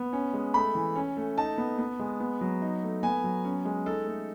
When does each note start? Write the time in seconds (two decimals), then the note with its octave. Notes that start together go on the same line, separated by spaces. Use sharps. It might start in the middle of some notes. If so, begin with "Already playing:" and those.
Already playing: B3
0.13 C#4
0.34 G#3
0.54 A3 B5
0.75 E3
0.96 C#4
1.17 A3
1.37 D#4 A5
1.58 B3
1.79 B3
1.99 G#3
2.20 B3
2.41 F#3
2.62 D#4
2.83 A3
3.03 B3 G#5
3.24 F#3
3.45 C#4
3.65 G#3
3.86 D#4 A4
4.07 A3